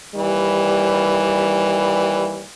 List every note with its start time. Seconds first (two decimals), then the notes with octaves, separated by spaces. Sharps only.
0.14 D#2 E3 G3